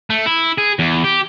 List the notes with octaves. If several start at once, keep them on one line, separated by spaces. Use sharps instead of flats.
A3
E4
G#4
E2
G4